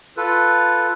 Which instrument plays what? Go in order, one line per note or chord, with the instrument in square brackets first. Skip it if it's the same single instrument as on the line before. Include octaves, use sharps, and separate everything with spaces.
[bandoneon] F4 A4 B4